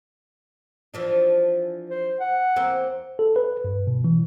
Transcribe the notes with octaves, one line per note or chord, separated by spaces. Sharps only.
E3 F3 D4
C5
F#5
E2 A#3 C4
A4
B4
G2
B2
E3